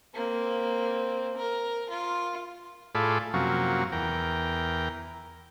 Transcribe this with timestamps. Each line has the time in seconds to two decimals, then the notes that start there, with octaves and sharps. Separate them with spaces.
0.14 A#3 C4
1.37 A#4
1.90 F4
2.95 A2 F4 G#4 A4 D5 B5
3.34 F#2 C3 F3 F#3 A#3 C#4
3.92 E2 A#4 G5